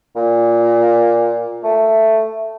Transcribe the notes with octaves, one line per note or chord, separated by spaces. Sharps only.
A#2
A3